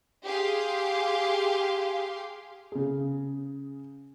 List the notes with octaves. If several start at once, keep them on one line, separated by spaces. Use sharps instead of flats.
G4 G#4 F5 C6
C#3 G#4